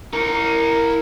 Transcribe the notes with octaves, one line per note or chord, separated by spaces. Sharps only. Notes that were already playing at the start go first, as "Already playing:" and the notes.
E4 A#4 A#5